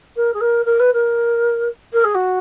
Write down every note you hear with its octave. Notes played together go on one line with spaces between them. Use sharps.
A#4
G#4
A#4
A#4
B4
A#4
A#4
G#4
F#4